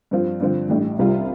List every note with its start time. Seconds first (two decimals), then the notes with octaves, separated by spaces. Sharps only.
0.11 G2 F3 C4 F4
0.40 G2 D3 F3 C4 F4
0.69 A1 A2 G3 D4
0.99 C2 C3 G3 F4